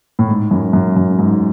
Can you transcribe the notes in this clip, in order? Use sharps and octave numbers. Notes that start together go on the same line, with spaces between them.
A2
G#2
F#2
F#2
F#2
G#2